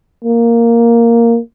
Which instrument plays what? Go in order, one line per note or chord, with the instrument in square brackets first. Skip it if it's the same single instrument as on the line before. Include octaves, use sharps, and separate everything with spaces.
[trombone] A#3